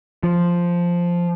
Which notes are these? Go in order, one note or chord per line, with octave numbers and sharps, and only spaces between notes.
F3